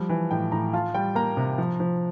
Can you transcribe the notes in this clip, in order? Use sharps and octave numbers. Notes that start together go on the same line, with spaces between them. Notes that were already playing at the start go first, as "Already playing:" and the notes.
Already playing: F3 G3
E3
A2 G5
A2 A#5
F4 A5
G3 G5
A#3 A#5
C3
F3
F3